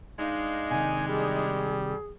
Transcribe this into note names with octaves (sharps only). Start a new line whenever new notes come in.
G#3 D4 D#4 F5
C3 D#3 G#5
G3 G#4